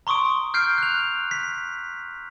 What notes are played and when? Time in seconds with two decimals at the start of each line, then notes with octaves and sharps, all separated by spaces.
0.07 A#5 C6 C#6 D#6 D7
0.54 F6 G6 C7 D7
0.78 F#6 F7
1.31 B6